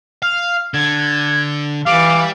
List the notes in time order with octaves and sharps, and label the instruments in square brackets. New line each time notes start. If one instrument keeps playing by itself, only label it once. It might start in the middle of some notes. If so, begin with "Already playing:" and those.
[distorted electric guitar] F5 [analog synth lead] F6
[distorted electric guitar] D3 [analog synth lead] G#6
[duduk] E3 [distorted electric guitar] G3 [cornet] F5 [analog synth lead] D6